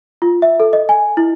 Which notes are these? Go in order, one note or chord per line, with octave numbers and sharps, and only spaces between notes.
F4
E5
A4
D#5
G#5
E4